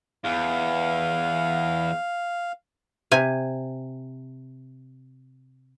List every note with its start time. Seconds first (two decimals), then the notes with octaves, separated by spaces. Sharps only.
0.24 E2 F5
3.11 C3 G#5